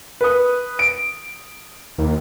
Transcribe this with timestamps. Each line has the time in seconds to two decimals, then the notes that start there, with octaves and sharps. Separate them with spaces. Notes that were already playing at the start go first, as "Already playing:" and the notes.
0.21 B4 D#6
0.79 D7
1.98 D#2